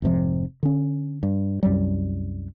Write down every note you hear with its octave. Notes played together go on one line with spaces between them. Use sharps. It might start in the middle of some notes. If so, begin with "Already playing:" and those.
F1 G#2 C3 F3
D3 C#4
G2
C2 F#2 F#3 G3